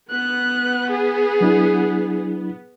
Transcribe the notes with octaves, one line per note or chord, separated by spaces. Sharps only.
B3 F#6
G#4
F#3 D4 E4